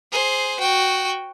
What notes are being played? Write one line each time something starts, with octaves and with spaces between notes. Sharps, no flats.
G#4 C5
F#4 G5